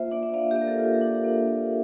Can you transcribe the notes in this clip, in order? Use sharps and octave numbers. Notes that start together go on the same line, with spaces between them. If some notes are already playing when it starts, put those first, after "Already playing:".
Already playing: A#3 F4 C5 E5
D4 D5
E5
A#3 D5 F5
A#3 G4
A#4
A4
F4
G4 A#4
D4
A#3
A#3